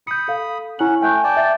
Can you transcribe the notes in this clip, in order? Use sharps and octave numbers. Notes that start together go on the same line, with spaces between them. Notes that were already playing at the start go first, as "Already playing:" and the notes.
B5 D#6 G6 C#7
A4 F5
C#4 E4 F#5 F#7
A3 G5 G#5 F#6 G6
D5 G5 A5
E5 A6